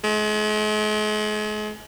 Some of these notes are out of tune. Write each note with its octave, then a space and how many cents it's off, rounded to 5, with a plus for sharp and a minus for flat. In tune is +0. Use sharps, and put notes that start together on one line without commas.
G#3 +40